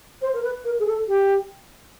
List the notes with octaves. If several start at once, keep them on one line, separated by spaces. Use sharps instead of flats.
C5
A#4
B4
A#4
G#4
A4
G4